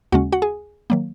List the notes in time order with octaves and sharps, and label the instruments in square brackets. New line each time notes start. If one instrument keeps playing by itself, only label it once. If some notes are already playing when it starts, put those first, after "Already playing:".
[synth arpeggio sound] D#2 C#3 G#3 C#4 F#4 F#5
F#4 F#5
G#4 G#5
D#3 F#3 A#3